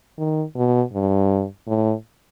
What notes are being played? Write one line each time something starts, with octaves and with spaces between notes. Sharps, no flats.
D#3
B2
G2
A2